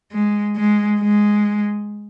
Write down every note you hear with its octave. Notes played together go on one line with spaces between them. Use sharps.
G#3
G#3
G#3